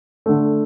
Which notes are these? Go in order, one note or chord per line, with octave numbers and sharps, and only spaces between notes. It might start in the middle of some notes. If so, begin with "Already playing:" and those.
D3 A3